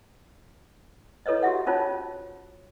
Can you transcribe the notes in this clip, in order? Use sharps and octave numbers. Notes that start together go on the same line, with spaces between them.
E4 A4 B4 C#5 D#5
F#4 G4 E5 F#5
C#4 D#4 F4 C5 C#5 A5